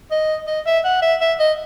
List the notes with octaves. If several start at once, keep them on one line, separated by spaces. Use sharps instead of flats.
D#5
D#5
E5
F#5
E5
E5
D#5